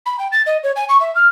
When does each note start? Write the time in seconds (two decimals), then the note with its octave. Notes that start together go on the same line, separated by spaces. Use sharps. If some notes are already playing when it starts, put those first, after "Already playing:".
0.06 B5
0.19 G5
0.32 A6
0.46 D#5
0.63 C#5
0.76 G#5
0.89 C#6
1.00 E5
1.15 F6